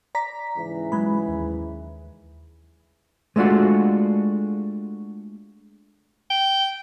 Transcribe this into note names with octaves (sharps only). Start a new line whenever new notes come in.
D5 A#5 B6
G#2 C#3 E3
F#3 G#3 B5
D#2
G#3 A3 D4 F4 F#4
G5